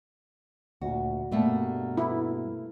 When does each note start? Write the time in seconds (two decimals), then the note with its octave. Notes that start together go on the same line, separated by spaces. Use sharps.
0.81 D2 A#2 F#4
1.31 G2 B2 G3 A3 A#3
1.97 E4